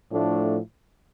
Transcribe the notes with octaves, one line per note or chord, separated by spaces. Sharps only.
A2 F3 A3 D4